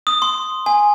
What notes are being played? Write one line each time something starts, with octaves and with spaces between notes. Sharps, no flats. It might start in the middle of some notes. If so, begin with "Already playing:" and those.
D#6
C6
G#5